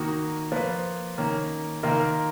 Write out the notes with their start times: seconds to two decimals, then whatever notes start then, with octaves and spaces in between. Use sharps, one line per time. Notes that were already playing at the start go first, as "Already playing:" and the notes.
Already playing: D#3 A#3 D#4 F#4
0.52 F3 A#3 F4 B4
1.17 D#3 A#3 C#4
1.83 D#3 A#3 F4 A#4